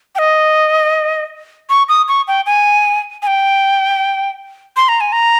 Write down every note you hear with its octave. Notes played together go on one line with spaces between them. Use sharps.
G5
D#5
C#6
D#6
C#6
G5
G#5
G#5
G5
C6
A#5
G#5
A#5